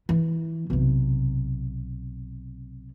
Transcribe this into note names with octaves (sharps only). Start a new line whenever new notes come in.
E3
B1 C3